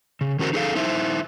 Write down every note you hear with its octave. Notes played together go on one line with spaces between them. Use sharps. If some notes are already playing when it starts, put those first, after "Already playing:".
C#3
D#3 C#4 F#4 G4 A#4 C5
D#4 G#4 A4 F5
D#4 E4 C5 E5